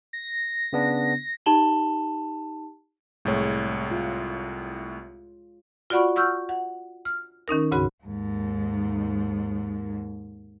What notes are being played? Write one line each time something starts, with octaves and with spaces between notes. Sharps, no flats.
A#6
C#3 B3 D4
D#4 G4 A5 E7 F#7 G7
C2 A2 G#3 C#5
F4
F4 F#4 D5 F#5 B5 C#6
F#5 C#6 E6 F6 G6
F#5
F6
D#3 C#4 D#4 A#4
D2 G#2 C#3 F#4 B5
D#2 G#2